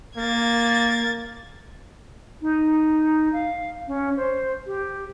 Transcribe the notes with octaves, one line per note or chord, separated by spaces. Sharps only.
A#3 G#6 A6
D#4
F5
C#4
C5
G4